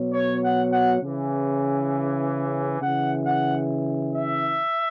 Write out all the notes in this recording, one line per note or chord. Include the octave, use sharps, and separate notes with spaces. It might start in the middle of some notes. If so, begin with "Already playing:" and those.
Already playing: B2 F#3
C#5
F#5
F#5
C#3 E3
C#3 E3 F#5
F#5
E5